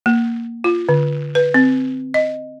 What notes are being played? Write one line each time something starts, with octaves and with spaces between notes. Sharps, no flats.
A#3
F4
D3
B4
C4
D#5